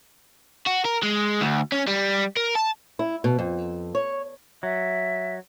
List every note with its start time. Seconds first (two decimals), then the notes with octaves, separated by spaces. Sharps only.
0.66 F#4
0.85 A#4
1.03 G#3
1.41 D2
1.72 C#4
1.87 G3
2.37 A#4
2.55 A5
2.99 E4
3.24 B2
3.39 F2
3.95 C#5
4.63 F#3 E5